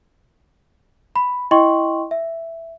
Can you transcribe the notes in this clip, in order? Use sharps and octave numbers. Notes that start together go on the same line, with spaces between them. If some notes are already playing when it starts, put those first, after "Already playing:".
B5
E4 D#5 G5 C6 C#6 F#7
E5